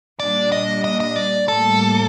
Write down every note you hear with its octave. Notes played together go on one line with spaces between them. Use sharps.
A#2 G3 D4 D5
D#5
D#5
D#5
D5
A2 G3 A#3 A4